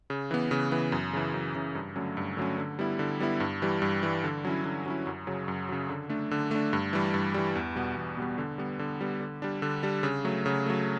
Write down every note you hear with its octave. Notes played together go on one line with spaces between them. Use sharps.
C#3
E3 B3
C#3
E3 B3
F#2
C#3 E3
F#2
C#3 E3
G2
D3 F#3 A3 C#4
G2
D3 F#3 A3 C#4
D3
G3 B3 E4
D3
G3 B3 E4
G2
E3 G3
G2
E3 G3
D3
F#3 C#4 E4
D3
F#3 C#4 E4
F#2
C#3 F#3
F#2
C#3 F#3
D3
A3 D4
D3
A3 D4
G2
E3 G3
G2
E3 G3
E2
B2 G3 B3
E2
B2 G3 B3
D3
G3 B3
D3
G3 B3
D3
G3 D4
D3
G3 D4
C#3
F#3 A3
C#3
F#3 A3